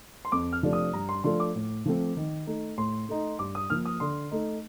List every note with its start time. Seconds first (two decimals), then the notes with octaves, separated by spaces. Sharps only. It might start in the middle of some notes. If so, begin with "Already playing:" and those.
0.25 C6
0.32 F2 D6
0.53 F6
0.63 C3 F3 A3 D4
0.73 D#6
0.93 G2 A#5
1.09 C6
1.24 F3 A3 D4 F4 C6
1.40 D6
1.55 A2
1.86 F3 A3 C4
2.17 D#3
2.47 A3 D#4
2.78 A2 C6
3.09 A3 D#4
3.39 G2 D6
3.55 D#6
3.70 F3 A#3 F6
3.85 D#6
4.00 D3 C6
4.31 A3 D#4